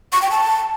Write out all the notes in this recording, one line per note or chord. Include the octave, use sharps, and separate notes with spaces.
C#6
G5
A5